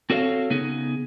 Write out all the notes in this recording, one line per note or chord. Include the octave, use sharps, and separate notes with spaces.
C4 F#4 A4 C#5 D#5 F5
C#3 B3 D#4 G#4